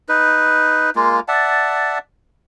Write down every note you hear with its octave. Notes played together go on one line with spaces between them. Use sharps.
D#4 B4
G#3 A#3 F4
D5 E5 F#5 A5